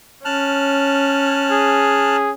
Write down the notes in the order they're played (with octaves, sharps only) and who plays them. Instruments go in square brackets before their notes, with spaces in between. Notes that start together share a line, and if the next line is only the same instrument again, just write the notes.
[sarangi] C#4 [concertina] A5 F6 F#6
[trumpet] G#4